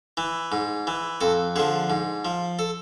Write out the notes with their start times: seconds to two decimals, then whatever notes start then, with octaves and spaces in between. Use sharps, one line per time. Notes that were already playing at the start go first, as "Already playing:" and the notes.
0.17 E3
0.52 G#2
0.87 E3
1.21 F2 A4
1.56 D3 F3 G#4
1.90 G#2
2.25 F3
2.59 A4